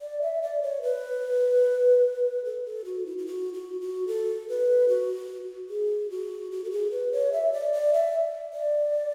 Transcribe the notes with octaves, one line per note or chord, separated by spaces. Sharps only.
D5
E5
D5
C#5
B4
A4
A4
F#4
E4
E4
F#4
F#4
F#4
A4
B4
F#4
G#4
F#4
F#4
A4
G#4
B4
C#5
E5
D5
D5
E5
D5